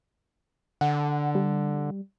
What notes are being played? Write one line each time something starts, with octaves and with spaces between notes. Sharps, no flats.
D3 F#5
G3